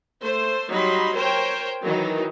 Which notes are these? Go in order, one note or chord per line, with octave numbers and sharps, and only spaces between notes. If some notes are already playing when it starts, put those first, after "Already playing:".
A3 C5
F#3 G3 D#4 B5 C6
A#4 C5 C#5 G5
D#3 E3 F#3 D#4